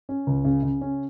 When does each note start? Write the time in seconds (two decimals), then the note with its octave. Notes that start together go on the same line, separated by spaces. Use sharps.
0.09 C#4
0.27 C#2
0.44 C#3
0.63 C#3
0.81 C#4